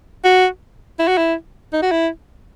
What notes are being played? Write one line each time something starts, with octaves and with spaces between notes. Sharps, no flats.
F#4
E4
F#4
E4
D#4
F#4
E4